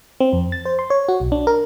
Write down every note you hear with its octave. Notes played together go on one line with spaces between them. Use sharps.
C4
F2
A6
C5
C6
C#5
F#4
B1
D4
A#4